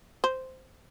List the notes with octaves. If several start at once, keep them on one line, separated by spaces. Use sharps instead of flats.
C5